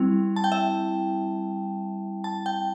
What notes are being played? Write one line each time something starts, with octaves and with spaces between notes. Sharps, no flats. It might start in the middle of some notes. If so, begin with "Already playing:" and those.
Already playing: G3 C4 E4
A5
G5
E5
A5
G5